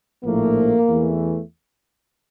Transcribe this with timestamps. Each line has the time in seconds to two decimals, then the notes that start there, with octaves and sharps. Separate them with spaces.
0.24 A#1 A2 F3 A3 A#3
0.89 E2 E3 A3